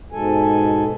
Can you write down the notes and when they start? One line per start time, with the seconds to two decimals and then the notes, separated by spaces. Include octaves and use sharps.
0.12 G#2 B2 G#3 A4 G#5